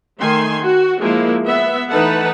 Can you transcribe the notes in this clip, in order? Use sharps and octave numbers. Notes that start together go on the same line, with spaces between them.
D#3 A3 G#5 C6
F#4
F3 G#3 A#3 E4
B3 E5
E3 A3 D#4 B4 F#5 A5